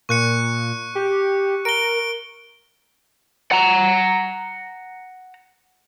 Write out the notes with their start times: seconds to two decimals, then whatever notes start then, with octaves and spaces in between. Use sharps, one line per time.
0.09 A#2 C#6 F#6 C#7
0.95 G4
1.65 A#4 D7 G7
3.52 F#5 A#5